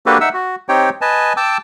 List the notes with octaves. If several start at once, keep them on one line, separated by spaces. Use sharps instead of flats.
A#3 D4 F#4 G4 A4 B4
D#4 E5 F#5 E6
F#4
C4 D#4 G4 C#5 G5
B4 D#5 G#5 A5
G5 A5 D6 E6